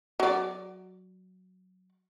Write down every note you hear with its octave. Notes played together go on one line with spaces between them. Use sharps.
F#3 D5